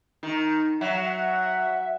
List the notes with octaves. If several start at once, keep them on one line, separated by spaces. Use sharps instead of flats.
D#3 D#4
F#3 E5 F#5